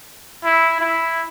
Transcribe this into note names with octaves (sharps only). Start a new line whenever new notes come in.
E4
E4